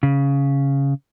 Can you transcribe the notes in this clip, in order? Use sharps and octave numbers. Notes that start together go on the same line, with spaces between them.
C#3